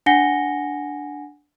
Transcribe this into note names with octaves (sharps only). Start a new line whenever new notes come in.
D4 F#5 G#5 A#6 C#7 G7